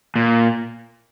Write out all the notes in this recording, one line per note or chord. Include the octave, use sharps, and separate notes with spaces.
A#2